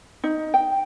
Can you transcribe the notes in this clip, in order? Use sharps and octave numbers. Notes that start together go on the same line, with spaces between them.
D#4
G5